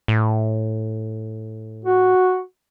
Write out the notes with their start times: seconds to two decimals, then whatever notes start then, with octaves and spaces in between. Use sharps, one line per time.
0.08 A2
1.85 F#4